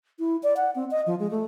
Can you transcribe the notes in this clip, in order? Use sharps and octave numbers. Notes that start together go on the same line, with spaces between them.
E4
D5
F#5
C4
D#5
F3
G#3
A3